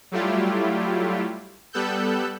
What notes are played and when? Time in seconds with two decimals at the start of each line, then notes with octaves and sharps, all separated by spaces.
0.11 F#3 G3 A3 E4 F4 G4
1.73 G3 B3 A4 E6 F#6 G6